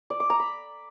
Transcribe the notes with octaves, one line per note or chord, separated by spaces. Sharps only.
D5
D6
A#5
B5